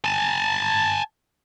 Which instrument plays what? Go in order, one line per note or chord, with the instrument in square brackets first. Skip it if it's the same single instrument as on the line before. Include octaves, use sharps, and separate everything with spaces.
[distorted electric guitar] G#5 A5